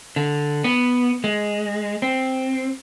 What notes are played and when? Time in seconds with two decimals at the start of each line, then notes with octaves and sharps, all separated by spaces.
0.16 D3
0.64 B3
1.24 G#3
2.02 C4